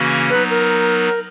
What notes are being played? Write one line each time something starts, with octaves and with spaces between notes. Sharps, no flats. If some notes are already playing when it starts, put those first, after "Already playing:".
Already playing: C#3 E3 A#3 C#4 F#4
F#3 B3 D#4 B4
A#4